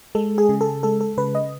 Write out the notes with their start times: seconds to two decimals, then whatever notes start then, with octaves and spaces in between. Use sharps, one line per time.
0.15 G#3 A4
0.38 G#4
0.49 C#3
0.61 A4
0.83 G#3 A4
1.01 A4
1.17 C#3 B4
1.35 D#5